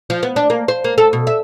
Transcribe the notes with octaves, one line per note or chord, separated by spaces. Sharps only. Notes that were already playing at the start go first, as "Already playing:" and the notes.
F3
B3
D4
A#3
C5
A#3
A4
B2
E5